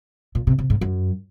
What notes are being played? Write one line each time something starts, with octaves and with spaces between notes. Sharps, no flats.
A#2
C3
C3
G#2
F#2